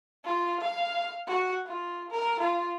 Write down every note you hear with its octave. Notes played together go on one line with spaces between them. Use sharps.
F4
F5
F#4
F4
A#4
F4